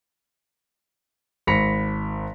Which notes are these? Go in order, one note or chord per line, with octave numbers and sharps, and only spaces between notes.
G#1 B5 A#6 B6 C#7 F7